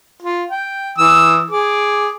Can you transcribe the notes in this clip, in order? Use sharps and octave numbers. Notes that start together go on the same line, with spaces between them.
F4
G5
E3 D#6 E6
G#4 D6